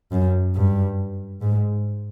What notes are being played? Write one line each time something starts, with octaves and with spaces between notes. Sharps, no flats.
F#2
G2
G#2